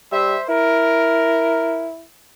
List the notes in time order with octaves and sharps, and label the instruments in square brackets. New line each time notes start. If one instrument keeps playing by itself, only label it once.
[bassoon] G3 [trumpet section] C5 E5
[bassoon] E4 [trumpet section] A#4